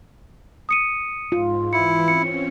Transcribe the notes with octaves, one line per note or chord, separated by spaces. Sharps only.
D#6 C#7 D#7
G#2 F4
E3 E4 C#7
C4 C#4 C#7